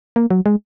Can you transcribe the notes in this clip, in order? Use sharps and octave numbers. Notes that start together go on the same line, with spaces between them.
A#3
F#3
G#3